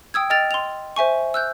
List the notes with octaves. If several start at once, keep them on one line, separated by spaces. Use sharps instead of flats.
G5 D#6 E6 G#6
D#5 G5 F6 A6 F7
C6 F7
C5 E5 G#5 C#6
E6 F#6 G6